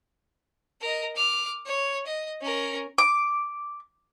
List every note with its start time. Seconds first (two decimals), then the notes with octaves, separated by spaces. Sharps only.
0.81 A#4 D#5
1.16 D6 F6
1.66 C#5
2.06 D#5
2.41 C#4 A#4
2.98 D6